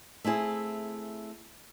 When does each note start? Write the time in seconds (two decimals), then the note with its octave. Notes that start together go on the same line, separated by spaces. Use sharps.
0.24 A3 C4 E4 G#4